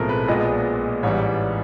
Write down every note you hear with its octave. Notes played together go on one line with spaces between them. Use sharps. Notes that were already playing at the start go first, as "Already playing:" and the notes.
Already playing: B1 A2 F3 G#3 C4 A4 A#4
B4
A#1 A#2 F3 G#3 B3 D#5
A1 G#2 E3 G3 C#5